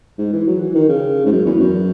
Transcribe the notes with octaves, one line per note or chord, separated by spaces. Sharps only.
G#2
E3
F#3
E3
D#3
C#3
G#2
F#2
E2
F#2